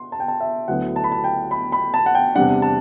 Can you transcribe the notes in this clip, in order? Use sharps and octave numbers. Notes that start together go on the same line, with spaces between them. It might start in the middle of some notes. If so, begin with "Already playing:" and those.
Already playing: C6
A5
G5
A5
E5
D2 D3 F#3 B3 E4 F#5
A5
B5
A5
G5
B5
B5
A5
F#5
G5
E2 C3 G3 D4 F#5
A5